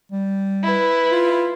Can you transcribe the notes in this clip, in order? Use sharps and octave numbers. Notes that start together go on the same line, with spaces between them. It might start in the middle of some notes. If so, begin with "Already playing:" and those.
G3
E4 B4
F4